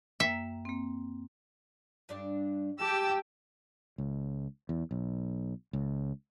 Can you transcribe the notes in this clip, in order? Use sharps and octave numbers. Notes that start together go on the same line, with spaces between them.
F#2 A#3 E5 G5
A#3 C4
G2 D4 D5
G#3 G4 G5 A5 E6
C#2
E2
B1
C#2